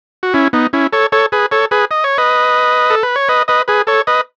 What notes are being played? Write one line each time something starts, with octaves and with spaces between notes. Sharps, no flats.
F#4
C#4 E4
B3 D#4
C#4 E4
A4 C#5
A4 C#5
G#4 B4
A4 C#5
G#4 B4
D#5
C#5
B4 D#5
A4
B4
C#5
B4 D#5
B4 D#5
G#4 B4
A4 C#5
B4 D#5